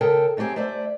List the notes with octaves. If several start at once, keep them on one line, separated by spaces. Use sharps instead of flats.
C#3 A4 A#4 G5 A5
F#3 A3 C4 G4 G#4
A3 C5 D5 E5